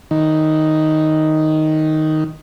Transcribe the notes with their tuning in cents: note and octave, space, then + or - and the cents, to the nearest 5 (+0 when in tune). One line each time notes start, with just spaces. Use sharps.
D#3 +0 D#4 +0